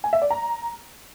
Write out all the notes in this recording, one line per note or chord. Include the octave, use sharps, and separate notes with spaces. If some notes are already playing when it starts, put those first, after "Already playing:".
G#5
E5
D5
A#5